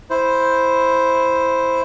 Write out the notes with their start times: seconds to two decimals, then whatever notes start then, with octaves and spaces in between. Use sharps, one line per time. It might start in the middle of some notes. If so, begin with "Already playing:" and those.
0.10 E4 C5